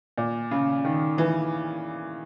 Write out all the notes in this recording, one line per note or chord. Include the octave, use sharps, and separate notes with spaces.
A#2
C#3
D#3
E3